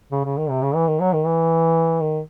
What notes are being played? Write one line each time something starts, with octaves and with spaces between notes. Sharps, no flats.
C#3
C#3
D#3
C3
C#3
E3
D#3
F#3
D#3
E3
D#3